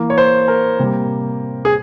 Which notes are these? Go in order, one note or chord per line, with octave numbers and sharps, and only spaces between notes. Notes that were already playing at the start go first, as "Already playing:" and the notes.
Already playing: E3 A#3
C#5
C5
A#4
C3 G3 A#3
G#4